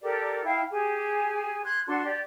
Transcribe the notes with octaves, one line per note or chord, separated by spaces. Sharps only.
G4 A4 A#4 D5
E4 F5 G5
G4 G#4 G#5
C6 F#6 G#6
D4 F#4 A4 C6
G4 D5